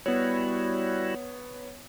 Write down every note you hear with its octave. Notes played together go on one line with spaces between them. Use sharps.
G3 B3 E4 F#4 C#5